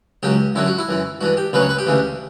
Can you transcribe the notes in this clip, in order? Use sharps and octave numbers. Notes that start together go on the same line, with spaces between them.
C#2 C#3 F#3 G4
F#2 D3 F#3 E4
F#4
E4
F#2 E3
G2 E3 F#4
G4
D2 C#3 F#3 B4
C#5
B4
G4
D2 C#3 E3